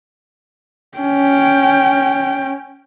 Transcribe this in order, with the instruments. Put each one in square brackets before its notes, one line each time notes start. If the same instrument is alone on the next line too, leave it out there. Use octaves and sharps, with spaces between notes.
[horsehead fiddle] C#4 G5